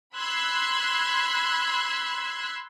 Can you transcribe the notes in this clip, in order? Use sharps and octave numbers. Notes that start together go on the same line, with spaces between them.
B5 C6 E6 F#6 G#6